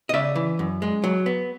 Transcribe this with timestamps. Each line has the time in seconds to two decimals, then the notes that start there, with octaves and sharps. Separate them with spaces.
0.09 D#5
0.13 C#3 D5 E5
0.36 E3
0.59 F#2
0.82 G#3
1.04 F#3
1.26 B3